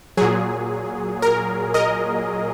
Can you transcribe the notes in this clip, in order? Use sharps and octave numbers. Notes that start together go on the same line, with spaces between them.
A#2 F#3 G#4
A#4
A#4 D#5